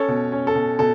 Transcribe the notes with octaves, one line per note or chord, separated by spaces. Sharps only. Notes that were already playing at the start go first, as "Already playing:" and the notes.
Already playing: C#4 A4 C#5
B2
C#4
A4
B2
B2 A4